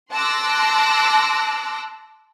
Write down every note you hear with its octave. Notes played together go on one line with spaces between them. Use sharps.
A5 C6 D6 E6 F#6 A#6